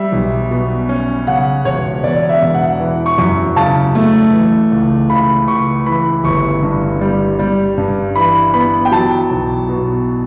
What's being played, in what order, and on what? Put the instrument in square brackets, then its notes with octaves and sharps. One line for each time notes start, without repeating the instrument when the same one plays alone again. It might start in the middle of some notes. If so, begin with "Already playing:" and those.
Already playing: [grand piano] G3 E5
B1
B2
C#4
C#3 F#5
E1 C#5
E2 D5
E5
E1
F#5
E3
C#6
F#2
C#3 A5
A3
E3
C#2
C#3 B5
C#2 C#6
E3 B5
G1 C#6
G2
G3
G3
G2
E3 B5
B3 B5
G5
F#3 A5
B1
B2